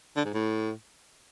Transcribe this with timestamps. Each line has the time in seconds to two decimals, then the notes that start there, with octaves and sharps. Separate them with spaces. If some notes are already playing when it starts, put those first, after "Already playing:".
0.16 D3
0.25 G#2
0.34 A2